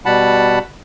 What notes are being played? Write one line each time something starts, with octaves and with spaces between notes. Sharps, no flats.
B2 G3 F#5 A5 B5